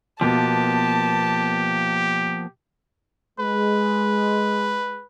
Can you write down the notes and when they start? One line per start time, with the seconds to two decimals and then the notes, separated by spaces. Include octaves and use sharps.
0.21 B2 F3 A#3 B3 G4 A5
3.39 G#3 B4